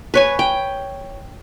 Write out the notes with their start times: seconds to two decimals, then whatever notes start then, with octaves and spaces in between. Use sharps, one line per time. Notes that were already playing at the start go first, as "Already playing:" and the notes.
0.14 B4 C#5 G#5
0.39 G5